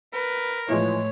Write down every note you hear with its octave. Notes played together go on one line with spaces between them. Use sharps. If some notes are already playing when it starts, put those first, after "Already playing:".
A#4 B4
A2 E3 F3 G#3 C#5